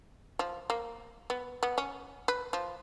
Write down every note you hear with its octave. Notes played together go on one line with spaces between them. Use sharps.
F3
A#3
B3
B3
C#4
B4
F3